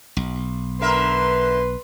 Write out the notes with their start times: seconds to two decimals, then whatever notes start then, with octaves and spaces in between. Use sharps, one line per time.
0.17 B1
0.81 D3 A#4 B4 E5 C6